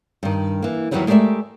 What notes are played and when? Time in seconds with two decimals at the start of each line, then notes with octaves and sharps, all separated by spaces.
0.23 G2 D#3
0.62 E3 A#3
0.91 E2 G#2 D#3 E3 F#3 G3
1.07 G#3 A3 G4 A#4 D5 E5